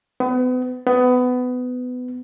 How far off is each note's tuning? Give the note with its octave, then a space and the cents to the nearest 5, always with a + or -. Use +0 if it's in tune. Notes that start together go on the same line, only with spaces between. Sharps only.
B3 +35
B3 +20